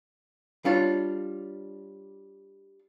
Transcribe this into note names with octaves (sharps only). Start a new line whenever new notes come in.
G3 D4 F4 C#5